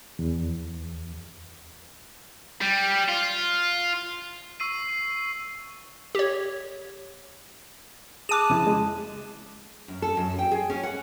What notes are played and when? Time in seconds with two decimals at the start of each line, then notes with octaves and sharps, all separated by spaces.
0.19 E2
2.61 G3
3.08 F4
4.60 C#6 E6 C7 D#7
6.15 G4 C#5
8.29 G#4 A5 D6 F#6 D#7
8.50 F2 C#3 E4
8.67 G#3
9.88 F#2
10.02 A4
10.17 F#2
10.39 G5
10.51 G#4
10.70 C#4
10.83 F#5